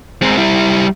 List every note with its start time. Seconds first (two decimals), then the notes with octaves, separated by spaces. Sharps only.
0.22 G#3 C4
0.37 G3 E4